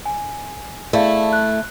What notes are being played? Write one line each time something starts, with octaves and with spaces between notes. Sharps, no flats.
G#5
A3 E4 G#4 D5 F5
F#6